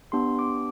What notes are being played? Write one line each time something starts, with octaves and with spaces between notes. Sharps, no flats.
B3 D4 G4 C6
D6